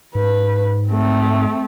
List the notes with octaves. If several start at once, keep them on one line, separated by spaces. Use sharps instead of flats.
G#2 B4
A3 C4